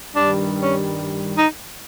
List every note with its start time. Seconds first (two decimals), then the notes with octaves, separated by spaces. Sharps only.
0.15 G2 D#3 G3 D4
0.60 C#4
1.37 D#4